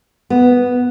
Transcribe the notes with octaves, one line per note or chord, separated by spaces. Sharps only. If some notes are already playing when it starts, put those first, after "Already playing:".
B3